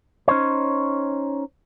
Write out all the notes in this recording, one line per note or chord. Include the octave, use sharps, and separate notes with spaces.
C#4 D#4 C5 C#5